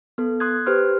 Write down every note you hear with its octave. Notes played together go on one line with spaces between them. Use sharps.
B3 A4
C6 D#6 F#6 G#6
G4 B4 C5 C6 F6